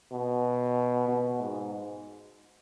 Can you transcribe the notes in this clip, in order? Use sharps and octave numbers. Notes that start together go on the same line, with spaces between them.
B2
B2
G#2